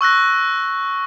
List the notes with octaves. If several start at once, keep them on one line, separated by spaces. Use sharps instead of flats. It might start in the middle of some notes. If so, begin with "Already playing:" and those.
C#6 E6 F#6 A#6